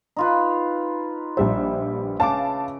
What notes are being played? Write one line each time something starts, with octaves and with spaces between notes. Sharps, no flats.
D#4 F4 B4
A#1 G3 C5 E5
C#3 F5 A5 D6